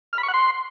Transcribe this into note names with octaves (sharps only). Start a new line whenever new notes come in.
F6
B5
C#6
F#5
C6